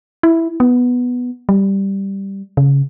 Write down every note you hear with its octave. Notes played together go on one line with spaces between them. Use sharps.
E4
B3
G3
C#3